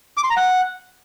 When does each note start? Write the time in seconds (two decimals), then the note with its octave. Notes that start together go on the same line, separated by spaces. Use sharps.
0.17 D6
0.24 C6
0.30 A#5
0.37 F#5